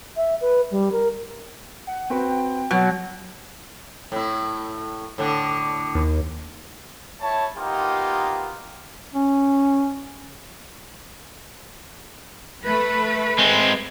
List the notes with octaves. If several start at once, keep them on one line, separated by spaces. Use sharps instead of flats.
E5
B4
G3
A#4
F#5
C4 F#4 B4 G5
B2 F#3 F#6
A2 E4
A2 D3 D4
D#2
E4 C#5 A5
A#3 B3 D#4 F4 G4
C#4
A3 B4
G#3 C4